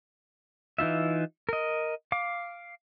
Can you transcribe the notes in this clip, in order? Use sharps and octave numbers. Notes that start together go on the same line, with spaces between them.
E3 D#4 F4 E5
A#4 D#5
F5 D6